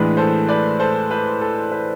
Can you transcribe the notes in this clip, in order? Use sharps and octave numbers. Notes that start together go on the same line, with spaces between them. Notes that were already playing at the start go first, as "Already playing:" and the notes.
Already playing: A2 E3 G#3 D4 B4
A4 C5
B4 D5
A4 C5
B4
A4
B4